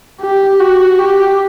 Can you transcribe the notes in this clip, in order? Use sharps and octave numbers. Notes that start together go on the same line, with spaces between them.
G4
F#4
G4